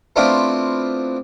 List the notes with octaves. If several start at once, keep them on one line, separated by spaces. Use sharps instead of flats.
A3 B3 C4 D4 E4 F4